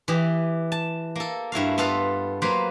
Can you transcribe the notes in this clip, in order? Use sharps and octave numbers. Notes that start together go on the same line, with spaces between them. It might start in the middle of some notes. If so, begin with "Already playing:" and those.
E3 G4 D#5
A5
A#3 A4
G2 E4 F#4 F5
B3 F4 A4 B4 F5
F#3 A#3 B4 C5